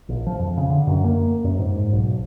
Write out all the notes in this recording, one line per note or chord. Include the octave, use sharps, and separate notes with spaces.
A#1
F3
F2
C#3
D3
F#2
A#3
F#2
G#2
B1